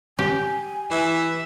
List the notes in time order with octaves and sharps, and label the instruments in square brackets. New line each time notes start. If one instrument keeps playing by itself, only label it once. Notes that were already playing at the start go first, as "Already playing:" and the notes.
[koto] G4 [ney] G#5
[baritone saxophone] E3 [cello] E5